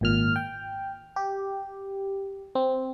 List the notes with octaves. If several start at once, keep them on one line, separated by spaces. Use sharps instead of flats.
G#1 A#2 F6
G5
G4
C4